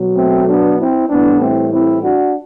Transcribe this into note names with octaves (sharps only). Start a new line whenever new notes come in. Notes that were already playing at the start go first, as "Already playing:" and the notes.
Already playing: B2 F#3
A3 C4
B3 D4
C4 E4
A2 E3 G3 B3 D4
A3 C4
C4 E4
D4 F#4